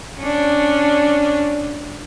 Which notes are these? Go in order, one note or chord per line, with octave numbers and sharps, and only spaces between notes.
C#4 D4